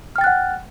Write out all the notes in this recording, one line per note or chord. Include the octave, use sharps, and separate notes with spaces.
F#5 G5 F6 F#6 A6